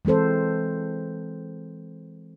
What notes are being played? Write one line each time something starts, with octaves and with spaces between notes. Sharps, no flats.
E3 G#3 C4 A4 C5